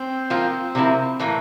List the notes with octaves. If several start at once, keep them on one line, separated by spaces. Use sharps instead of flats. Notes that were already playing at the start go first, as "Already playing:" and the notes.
Already playing: C4
F3 A#3 F4
C3 F3 A#3 E4
A2 E3 A#3